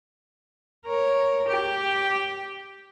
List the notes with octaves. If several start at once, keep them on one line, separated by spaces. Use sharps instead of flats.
A#4 C#5
G4